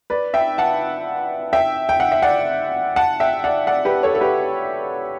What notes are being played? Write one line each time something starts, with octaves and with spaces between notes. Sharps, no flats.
B4 D5
E5 G5
F#5 A5
E5 G5
G5
F#5
E5
D5 F#5
F#5 A5
E5 G5
D5 F#5
D5 F#5
G4 B4
A4 C#5
A4
G4 B4